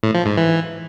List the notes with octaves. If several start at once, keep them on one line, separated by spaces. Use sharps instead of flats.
A2
F3
G#2
E3